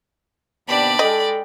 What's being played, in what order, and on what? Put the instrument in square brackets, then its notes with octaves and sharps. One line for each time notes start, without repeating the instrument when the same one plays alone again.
[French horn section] D#2 C3 B3 [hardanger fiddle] D4 G4 [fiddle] D5 B5
[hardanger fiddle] G#3 G5 [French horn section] A4 [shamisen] D#5